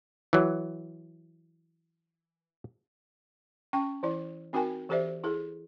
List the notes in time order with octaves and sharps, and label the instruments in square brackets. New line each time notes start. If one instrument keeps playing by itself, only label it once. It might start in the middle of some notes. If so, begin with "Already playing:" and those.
[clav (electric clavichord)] E3 F#3
[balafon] C#4 G5 C#6
E3 E4 D5
C4 D#4 F#4 A#4 G5 G#5
E3 G4 A4 C5 D5 E5
E4 G#4 A4